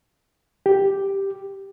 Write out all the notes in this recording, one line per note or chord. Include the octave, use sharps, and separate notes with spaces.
G4